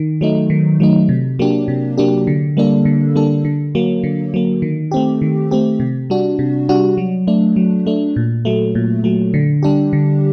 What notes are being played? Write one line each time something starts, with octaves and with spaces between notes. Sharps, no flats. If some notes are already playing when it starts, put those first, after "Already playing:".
Already playing: D#3
F#3 A3 D#4
D#3
F#3 A3 D#4
C3
F#3 A#3 D4 G4
C3
F#3 A#3 D4 G4
D3
G3 A#3 D4 A4
D3
G3 A#3 D4 A4
D3
F#3 A#3
D3
F#3 A#3
D#3
A3 C4 G4
D#3
A3 C4 G4
C3
G3 D4 F#4
C3
G3 D4 F#4
F#3
A3 D4
F#3
A3 D4
A#2
F#3 A3
A#2
F#3 A3
D3
G3 D4 G4
D3